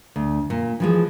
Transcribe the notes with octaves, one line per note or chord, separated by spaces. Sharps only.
D2
A#2
E3 F3 G#3